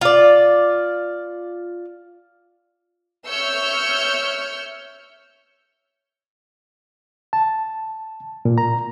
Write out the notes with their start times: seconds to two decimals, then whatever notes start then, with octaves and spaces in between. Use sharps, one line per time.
0.01 F4 D5
3.27 C#5 E5 E6 F6 G6 C#7
7.33 A5
8.45 A#2
8.58 A#5